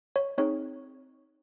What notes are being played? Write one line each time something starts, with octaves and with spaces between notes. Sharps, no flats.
C#5
C4 D#4 G#4 C#5